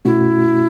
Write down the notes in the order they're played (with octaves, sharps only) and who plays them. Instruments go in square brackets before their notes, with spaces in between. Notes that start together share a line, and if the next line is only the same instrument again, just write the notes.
[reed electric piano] B2 A3 C#4 F#4 [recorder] E4